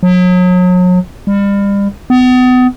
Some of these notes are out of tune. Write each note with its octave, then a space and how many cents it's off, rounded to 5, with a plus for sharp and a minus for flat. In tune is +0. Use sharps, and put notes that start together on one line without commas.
F#3 -35
G3 +35
B3 +35